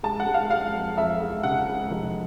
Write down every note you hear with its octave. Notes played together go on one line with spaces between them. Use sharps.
G#3 A5
F#5
G#3
F5
G#3 F5
F2
F2 E5
G#3
C#3 F#5
G#3
F1